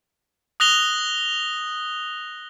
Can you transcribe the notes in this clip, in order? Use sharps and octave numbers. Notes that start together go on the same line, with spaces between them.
D#6 F#6 A#6 F7 G7